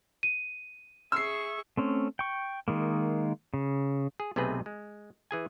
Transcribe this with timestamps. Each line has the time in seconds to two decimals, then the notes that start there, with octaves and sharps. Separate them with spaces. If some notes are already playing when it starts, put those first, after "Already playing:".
0.23 D#7
1.12 G#4 E5 C#6 E6 C7
1.77 A3 C4 C#4
2.19 G5 C#6
2.68 D#3 G#3 A#3
3.54 C#3
4.20 G#4
4.36 B1 C3 A3 C4 G#4 B4
4.66 G#3
5.31 E3 G#4 G#5